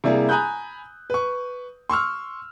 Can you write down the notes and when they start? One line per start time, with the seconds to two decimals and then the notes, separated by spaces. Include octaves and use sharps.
0.04 C3 G3 A#3 D4 E4 G#4
0.29 G#5 A#5 B5 D#6 F#6 G6
1.10 B4 C#6
1.90 C6 C#6 E6 F6